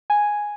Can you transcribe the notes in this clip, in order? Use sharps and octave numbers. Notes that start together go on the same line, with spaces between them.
G#5